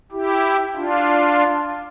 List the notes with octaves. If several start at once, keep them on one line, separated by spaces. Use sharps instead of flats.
E4 G4
D4 F4